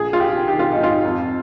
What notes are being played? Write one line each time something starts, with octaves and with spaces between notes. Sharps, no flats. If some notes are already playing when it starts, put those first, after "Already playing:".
Already playing: A#1 G#4
F4
A#1 G4
D#3 G4
F4
G#2 D#4
F4
F2